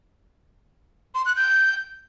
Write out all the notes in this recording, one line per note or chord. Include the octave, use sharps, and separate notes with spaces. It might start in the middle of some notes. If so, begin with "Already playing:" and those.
C6
F#6
G6